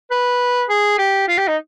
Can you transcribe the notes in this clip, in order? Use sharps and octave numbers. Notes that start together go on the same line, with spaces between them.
B4
G#4
G4
F4
G4
D#4